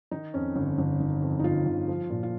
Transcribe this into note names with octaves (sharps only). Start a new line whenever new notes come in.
D#3 D#4
F2 C#4
G1
G1
D#3
F2
D#4
G1 F4
G1
F3
A#2
F4